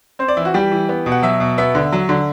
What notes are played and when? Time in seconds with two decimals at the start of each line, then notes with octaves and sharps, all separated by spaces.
0.19 C4 C5
0.28 D5
0.37 E3 E4
0.45 F#4
0.54 G3 G4
0.72 E3
0.89 B3
1.06 B2
1.12 F#5
1.23 F#3 E5
1.40 B2
1.58 B3 E5
1.75 D3
1.92 F#3
2.09 D3